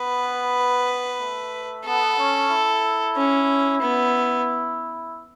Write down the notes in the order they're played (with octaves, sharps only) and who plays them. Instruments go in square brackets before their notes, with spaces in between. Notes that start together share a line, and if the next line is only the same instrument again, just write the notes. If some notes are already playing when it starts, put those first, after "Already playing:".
Already playing: [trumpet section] B3 [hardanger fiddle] B4
[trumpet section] A3
[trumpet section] B3 [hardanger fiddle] A4
[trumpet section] C#4
E4
[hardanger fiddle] C#4
B3